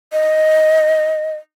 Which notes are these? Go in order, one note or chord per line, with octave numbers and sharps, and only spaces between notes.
D#5